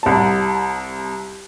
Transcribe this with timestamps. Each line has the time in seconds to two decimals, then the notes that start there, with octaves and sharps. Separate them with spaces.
0.03 C2 A5